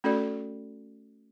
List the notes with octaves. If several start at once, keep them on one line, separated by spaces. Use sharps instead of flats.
A3 C#4 F#4 A4 D5